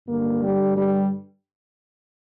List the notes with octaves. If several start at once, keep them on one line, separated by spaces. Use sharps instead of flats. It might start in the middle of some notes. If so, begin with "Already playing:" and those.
G2 D3 A#3
G3
G3